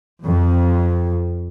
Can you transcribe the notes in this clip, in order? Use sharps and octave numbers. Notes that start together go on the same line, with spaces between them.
F2